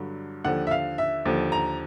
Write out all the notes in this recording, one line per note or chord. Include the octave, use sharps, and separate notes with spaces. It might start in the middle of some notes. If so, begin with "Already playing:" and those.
Already playing: G2 D3 F#3
D#2 D3 F3 F#5
E5
F5
E5
D#2 D3 F3
A#5